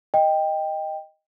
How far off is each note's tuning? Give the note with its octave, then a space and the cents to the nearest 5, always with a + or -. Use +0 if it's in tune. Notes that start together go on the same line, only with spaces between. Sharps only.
D#5 +0 G5 +10